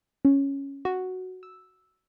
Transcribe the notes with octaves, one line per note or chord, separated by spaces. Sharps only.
C#4
F#4
E6